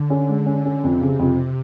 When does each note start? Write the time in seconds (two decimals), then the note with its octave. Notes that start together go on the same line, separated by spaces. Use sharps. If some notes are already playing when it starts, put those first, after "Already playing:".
Already playing: D3
0.10 C#4
0.29 G#3
0.46 C#4
0.65 C#4
0.83 F2 C3
1.01 C#3
1.19 F2